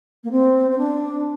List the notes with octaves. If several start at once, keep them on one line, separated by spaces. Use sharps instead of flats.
A#3
C4
C4
D4